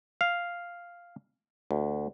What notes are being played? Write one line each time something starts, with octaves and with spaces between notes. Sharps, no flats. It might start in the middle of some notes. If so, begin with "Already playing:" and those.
F5
D2